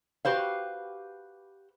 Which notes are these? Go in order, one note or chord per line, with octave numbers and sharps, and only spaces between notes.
F#4 G4 B4 C5 F5